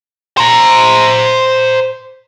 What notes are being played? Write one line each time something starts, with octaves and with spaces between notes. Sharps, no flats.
C5 A#5